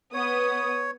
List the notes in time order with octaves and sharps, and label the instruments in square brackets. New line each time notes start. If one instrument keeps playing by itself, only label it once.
[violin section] B3 D#6 [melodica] C#5